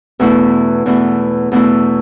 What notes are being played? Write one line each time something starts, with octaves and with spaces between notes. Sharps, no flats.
E2 B2 A3 E4
E2 B2 A3 E4
E2 B2 A3 E4